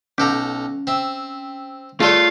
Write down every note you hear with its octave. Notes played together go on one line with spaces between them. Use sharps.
B1 C#4 A4 A#5
C4 E5
A3 F4 G#4 A4 C#5 D5